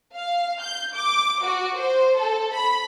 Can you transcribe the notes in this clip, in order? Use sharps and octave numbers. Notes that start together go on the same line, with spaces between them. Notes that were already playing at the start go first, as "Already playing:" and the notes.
F5
G6
D6
F#4
C5
A4
B5